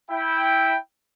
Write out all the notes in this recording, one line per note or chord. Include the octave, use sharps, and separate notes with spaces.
E4 G5